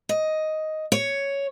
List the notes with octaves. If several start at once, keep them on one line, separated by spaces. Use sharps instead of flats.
D#5
C#5